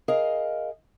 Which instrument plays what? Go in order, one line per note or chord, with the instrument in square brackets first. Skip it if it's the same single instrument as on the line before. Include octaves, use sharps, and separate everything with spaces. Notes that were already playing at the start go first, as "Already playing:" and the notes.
[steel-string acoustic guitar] G#4 A#4 D#5 F5